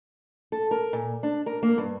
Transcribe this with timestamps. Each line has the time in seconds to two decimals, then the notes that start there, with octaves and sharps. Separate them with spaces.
0.52 A4
0.71 A#4
0.93 A#2
1.23 D4
1.46 A#4
1.63 A#3
1.78 G2